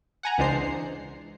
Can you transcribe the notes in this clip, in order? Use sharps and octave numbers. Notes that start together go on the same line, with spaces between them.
F#5 G#5 A#5
C#2 E3 G#3 D4 C5 C7